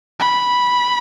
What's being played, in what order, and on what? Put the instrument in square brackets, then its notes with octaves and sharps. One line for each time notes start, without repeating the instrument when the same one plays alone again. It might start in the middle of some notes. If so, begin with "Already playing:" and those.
[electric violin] B5